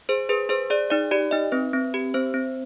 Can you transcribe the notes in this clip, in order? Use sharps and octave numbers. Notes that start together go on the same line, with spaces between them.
G#4 C5
G#4 B4
G#4 C5
G#4 D5
D#4 D5
G4 D5
D#4 D#5
C4 B4
C4
G4
C4 C5
C4